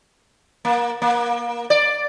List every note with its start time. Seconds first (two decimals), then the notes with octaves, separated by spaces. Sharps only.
0.65 A#3
1.02 A#3
1.70 D5